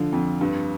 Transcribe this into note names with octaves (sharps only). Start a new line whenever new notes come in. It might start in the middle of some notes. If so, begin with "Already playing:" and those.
Already playing: D3 F3
F2
G2